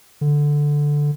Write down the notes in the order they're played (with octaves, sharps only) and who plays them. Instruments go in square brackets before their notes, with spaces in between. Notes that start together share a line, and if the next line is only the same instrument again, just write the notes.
[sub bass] D3